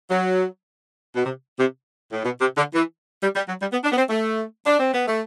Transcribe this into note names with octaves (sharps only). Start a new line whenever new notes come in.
F#3
B2
C3
C3
A2
B2
C3
D3
E3
G3
G3
F#3
G3
B3
D4
B3
C4
A3
D4
C4
B3
A3